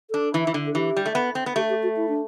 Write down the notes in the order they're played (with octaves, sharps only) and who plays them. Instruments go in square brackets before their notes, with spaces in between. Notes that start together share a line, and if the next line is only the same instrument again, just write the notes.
[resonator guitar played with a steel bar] D4 [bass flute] A4
[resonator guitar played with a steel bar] E3
E3
D3
[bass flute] A4
[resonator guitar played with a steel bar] E3 [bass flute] G4
[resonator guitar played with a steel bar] G3
A3
B3
C4
B3
[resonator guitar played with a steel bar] A3 [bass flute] G4
[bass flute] G4
F#4
E4
D4